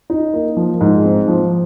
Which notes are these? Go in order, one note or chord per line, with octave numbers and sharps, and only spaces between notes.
D#4
A#3
F3
G#2
C4
F3